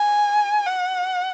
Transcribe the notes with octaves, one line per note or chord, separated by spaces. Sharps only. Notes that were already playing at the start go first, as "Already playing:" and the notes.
Already playing: G#5
F#5